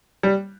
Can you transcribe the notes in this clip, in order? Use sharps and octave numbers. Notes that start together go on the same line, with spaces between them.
G3